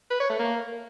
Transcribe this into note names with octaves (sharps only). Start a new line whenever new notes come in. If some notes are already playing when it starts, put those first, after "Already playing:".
B4
C#5
A3
A#3